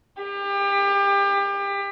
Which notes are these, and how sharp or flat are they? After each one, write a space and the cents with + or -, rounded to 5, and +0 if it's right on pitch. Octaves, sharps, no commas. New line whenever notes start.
G4 +30